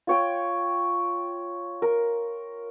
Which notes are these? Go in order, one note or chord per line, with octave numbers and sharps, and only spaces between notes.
F4 C#5 G5
A#4